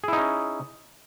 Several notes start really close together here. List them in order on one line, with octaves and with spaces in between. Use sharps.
G#4 E4 D#4 C#4